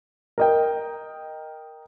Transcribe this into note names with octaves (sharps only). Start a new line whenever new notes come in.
A#4 D#5 G5